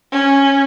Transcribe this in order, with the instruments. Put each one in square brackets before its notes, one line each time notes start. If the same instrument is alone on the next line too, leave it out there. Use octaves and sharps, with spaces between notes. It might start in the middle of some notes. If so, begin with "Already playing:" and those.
[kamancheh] C#4